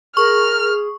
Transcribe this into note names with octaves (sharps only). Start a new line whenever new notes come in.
G#4 A#4 C#6 F6